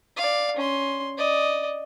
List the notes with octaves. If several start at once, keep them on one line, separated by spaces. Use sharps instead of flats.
D5 F5
C#4 C6
D5 D#5